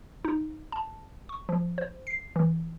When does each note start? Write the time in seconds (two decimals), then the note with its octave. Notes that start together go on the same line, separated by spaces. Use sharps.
0.25 D#4
0.72 A5
1.29 C#6
1.49 F3
1.78 C5
2.07 C7
2.36 E3